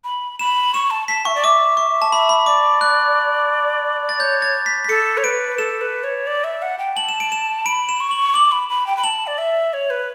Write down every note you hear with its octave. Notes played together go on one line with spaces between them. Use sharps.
B5
B5 E7
C#6 E7
A5
A5 B6
E5 C#6
D5
E5 D6
C#6
A5
E5 B5
B5
D5 D6
F#6
A6
C#5 G6
A6
B6
B6
A4 C#7
C#5
B4 D7
A4 E7
B4
C#5
D5
E5
F#5
G5
A5 F#7
E7
D7
E7
B5 D7
E7
C#6
F#7
D6 F#7
B5
B5
G5
B5
A5 F#7
D5
E5
C#5
B4